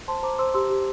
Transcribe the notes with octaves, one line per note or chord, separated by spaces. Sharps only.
C5 A5 C6
C5 A#5 D6
C5 C6 E6
G4 C6 E6
G4